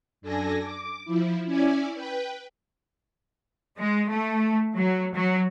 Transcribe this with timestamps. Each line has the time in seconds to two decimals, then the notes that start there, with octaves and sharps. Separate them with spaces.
0.21 F#2 D4 A4 G#5 A#6
0.59 D6
1.05 F3 E4
1.45 C#4 E4 D5 G#5
1.94 B4 G5
3.78 G#3
4.10 A3
4.75 F#3
5.14 F#3